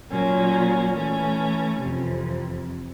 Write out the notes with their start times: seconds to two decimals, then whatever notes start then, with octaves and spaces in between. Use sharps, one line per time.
0.10 A#2 F#3 A#3 C#4
0.95 E3 A3 C#4
1.80 F2 C3 E3